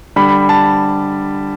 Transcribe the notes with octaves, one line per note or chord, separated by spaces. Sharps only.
D3 G3 B5
A5